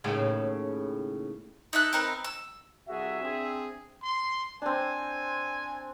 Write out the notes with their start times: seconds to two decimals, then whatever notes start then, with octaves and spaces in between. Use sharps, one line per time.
0.04 D#2 A2 C#3
1.73 D#4 A4 E5 F#6
1.93 C4 D#4 A#4 B4
2.24 E6
2.89 C2 F#4 G#4 E5
3.22 C4 D4 G#4
4.03 C6
4.62 C4 D4 G#5